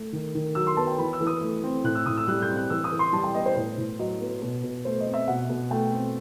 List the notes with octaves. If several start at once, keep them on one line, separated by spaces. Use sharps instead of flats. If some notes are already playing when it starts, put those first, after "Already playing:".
Already playing: A3
D#3
D#3
F#3 E6
C6
B3 A5
G5
E3 B5
E6
E3
D#6
A3
C4
A2 F#6
E6
A2 D#6
E6
G3 F#6
G6
C4
F#6
E3 E6
D#6
E3
C6
G3 A5
G5
B3 D#5
C5
A2 C5
A2
F#3 D#5
B3
B2
B2
A3 C5
D#5
C4
E5
B2 F#5
B2
A3 G5
C4